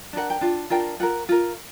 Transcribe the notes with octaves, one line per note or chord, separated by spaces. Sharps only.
D4 F4 A#4 F#5
G5
D4 F4
D4 F4 A#4 G5
F4 A#4 F#5
F4 A#4